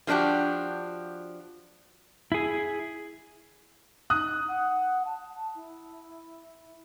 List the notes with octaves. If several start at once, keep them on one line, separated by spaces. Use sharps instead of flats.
F3 G#3 D4 F#4 G4
E4 G#4
D#4 D#6 F#6
F#5
A5
E4